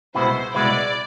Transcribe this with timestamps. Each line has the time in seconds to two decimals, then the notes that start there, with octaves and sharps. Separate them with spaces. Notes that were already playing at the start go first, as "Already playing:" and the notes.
0.15 C2 B2 G#3 B3 E4 C5
0.54 C2 B2 G#3 B3 E4 D5